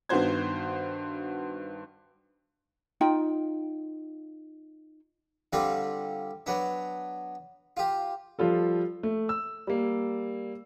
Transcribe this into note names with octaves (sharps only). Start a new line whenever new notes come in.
G2 D#3 B3 F#4 C5 G#6
D#4 F4 G5
D3 G3 C4 F4 D5
F#3 B3 D4
F4 G4
F3 G3 F4 A4
A3
E6
G3 A#3